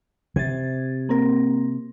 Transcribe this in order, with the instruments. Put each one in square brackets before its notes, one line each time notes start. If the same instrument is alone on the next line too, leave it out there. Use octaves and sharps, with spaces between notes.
[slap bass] C3 [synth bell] G#6 A6
[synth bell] A#3 C4 A#4